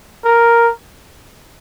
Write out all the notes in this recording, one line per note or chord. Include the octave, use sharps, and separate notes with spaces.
A#4